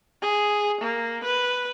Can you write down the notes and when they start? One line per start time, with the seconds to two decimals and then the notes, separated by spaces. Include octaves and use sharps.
0.22 G#4
0.81 A#3
1.24 B4